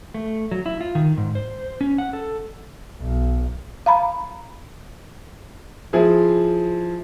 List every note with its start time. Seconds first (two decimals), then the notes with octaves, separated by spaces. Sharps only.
0.14 A3
0.51 F#3
0.66 E4
0.81 F4
0.95 D#3
1.17 G#2
1.35 C5
1.81 C#4
1.98 F#5
2.13 A4
3.01 B1
3.86 F5 A#5 B5
5.93 F3 E4 G#4 C5